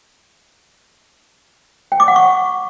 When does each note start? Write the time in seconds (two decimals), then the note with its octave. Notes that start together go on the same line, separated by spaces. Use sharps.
1.92 G5
2.00 D6
2.08 F#5
2.16 C#6